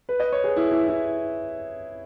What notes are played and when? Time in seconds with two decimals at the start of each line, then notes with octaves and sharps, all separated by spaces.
0.09 B4
0.20 D#5
0.32 C#5
0.44 G#4
0.56 E4
0.71 E4
0.88 E4